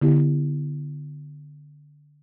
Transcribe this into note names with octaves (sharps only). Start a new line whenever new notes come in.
D3 B3 E4 G4